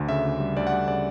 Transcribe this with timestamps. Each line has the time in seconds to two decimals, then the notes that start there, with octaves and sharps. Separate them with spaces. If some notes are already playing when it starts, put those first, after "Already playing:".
Already playing: D2 D3
0.09 C#3 E5
0.25 D2
0.40 G3
0.57 D2 D5
0.67 F#5
0.72 G3
0.88 C#3 D5